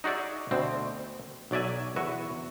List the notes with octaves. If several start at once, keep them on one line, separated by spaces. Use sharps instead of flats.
D#4 F#4 G#4 D5 E5
D2 B2 D3 C4
B1 F#3 D5 E5 G#5
E2 F#4 B4 E5